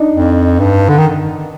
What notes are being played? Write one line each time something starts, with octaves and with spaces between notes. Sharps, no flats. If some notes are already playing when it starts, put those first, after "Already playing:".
Already playing: D4 D#4
F2
G2
D3
D#3